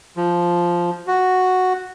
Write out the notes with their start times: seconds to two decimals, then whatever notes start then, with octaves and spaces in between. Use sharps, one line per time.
0.17 F3
1.07 F#4